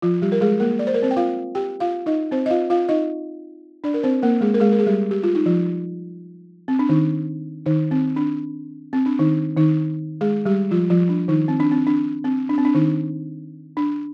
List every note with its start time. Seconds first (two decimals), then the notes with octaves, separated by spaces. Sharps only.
0.02 F3 F4
0.22 G3 G4
0.32 A#4
0.41 G#3 G#4
0.60 A#3 A#4
0.79 D5
0.87 C5
0.94 A#4
1.02 C4 C5
1.11 G5
1.16 F4 F5
1.55 G4 G5
1.80 F4 F5
2.06 D#4 D#5
2.31 C4 C5
2.46 D#5
2.50 F4 F5
2.70 F4 F5
2.89 D#4 D#5
3.84 D4 D5
3.94 A#4
4.03 C4 C5
4.22 A#3 A#4
4.41 G#3 G#4
4.54 A#4
4.60 G#3 G#4
4.72 A#4
4.79 G#4
4.86 G3 G4
5.11 G4
5.23 F4
5.35 D#4
5.46 F3 F4
6.68 C4
6.79 D4
6.89 D#3 D#4
7.66 D#3 D#4
7.91 C4
8.16 D4
8.93 C4
9.06 D4
9.19 D#3 D#4
9.57 D#3 D#4
10.21 G#3 G#4
10.45 G3 G4
10.71 F3 F4
10.90 F3 F4
11.09 D4
11.28 D#3 D#4
11.48 C4
11.60 D4
11.71 C4
11.87 D4
12.24 C4
12.49 D4
12.58 C4
12.65 D4
12.75 D#3 D#4
13.77 D4